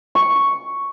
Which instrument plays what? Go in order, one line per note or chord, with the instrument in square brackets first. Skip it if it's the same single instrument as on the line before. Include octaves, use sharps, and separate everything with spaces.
[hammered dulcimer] C#6